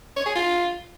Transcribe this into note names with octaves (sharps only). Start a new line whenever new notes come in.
C#5
G#4
F4